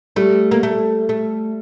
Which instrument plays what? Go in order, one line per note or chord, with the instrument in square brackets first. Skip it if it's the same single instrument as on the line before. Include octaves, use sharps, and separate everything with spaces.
[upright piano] G3 [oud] A3
[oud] A#3
A3
A3